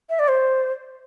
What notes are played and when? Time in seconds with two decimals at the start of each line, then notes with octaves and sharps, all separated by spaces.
0.10 E5
0.19 D5
0.28 C5